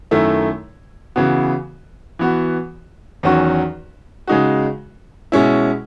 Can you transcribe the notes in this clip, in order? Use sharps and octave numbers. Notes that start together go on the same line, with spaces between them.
F#2 D#3 A3 E4
C#3 E3 B3 F#4
E3 B3 F#4
E2 D#3 F#3 C#4 F#4
C#3 G#3 D#4 F#4
B2 G#3 C#4 E4